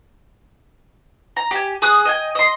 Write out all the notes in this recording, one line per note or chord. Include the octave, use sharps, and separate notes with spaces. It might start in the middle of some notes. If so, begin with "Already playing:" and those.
A#5
G4 G#5
G#4 D#6 F#6
D#5 G5 G#5
D#5 C6